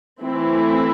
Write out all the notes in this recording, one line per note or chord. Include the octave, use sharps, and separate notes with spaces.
E3 A3 C4 E4